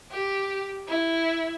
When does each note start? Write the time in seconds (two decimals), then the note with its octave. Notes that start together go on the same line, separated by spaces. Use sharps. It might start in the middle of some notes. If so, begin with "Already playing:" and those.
0.11 G4
0.88 E4